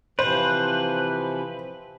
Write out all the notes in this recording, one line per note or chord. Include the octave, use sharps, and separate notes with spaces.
C3 E3 F3 B4 C5